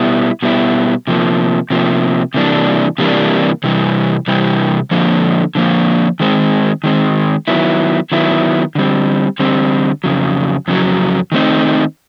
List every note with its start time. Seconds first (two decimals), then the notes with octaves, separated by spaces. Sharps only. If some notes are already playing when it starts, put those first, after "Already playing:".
Already playing: B2 G3 B3 E4
0.42 B2 G3 B3 E4
1.07 C3 F3 A#3
1.70 C3 F3 A#3
2.34 C3 E3 G3 A#3 D4
2.98 C3 E3 G3 A#3 D4
3.64 C3 E3 G3
4.28 C3 E3 G3
4.91 D3 F3 A#3
5.55 D3 F3 A#3
6.20 D#3 G#3 C4
6.84 D#3 G#3 C4
7.48 D#3 F#3 B3 E4
8.12 D#3 F#3 B3 E4
8.75 D3 G3 C4
9.39 D3 G3 C4
10.04 F2 C#3 F#3
10.68 F2 C#3 F#3
11.32 D#3 F#3 A3 C4 D#4